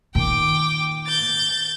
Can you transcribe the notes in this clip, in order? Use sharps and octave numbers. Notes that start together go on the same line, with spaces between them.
A#2 D#3 G5 D6
G6 A6